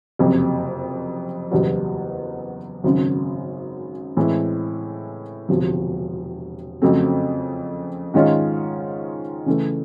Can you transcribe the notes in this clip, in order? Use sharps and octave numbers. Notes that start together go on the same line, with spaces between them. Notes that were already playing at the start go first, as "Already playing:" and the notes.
F#1 F2 C3
F#1 E2 B2 G3
G#1 F#2 C#3
A2 E3 G#3 C4 E4
E1 D2 C3 F3
F2 C#3 F#3 A3 C4
G#2 D#3 G#3 C#4 F4
C#3 E3 A3